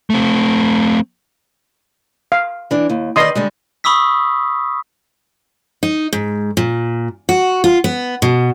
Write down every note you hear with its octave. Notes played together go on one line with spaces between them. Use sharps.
A3 C4
F5
E3 D4
D#2
D#3 B4 D5 D#5 C6 D#6
D3 G3 G#3
B5 C#6 D#6 E6 B6
D#4
G#2
A#2
F#4
F4
B3
B2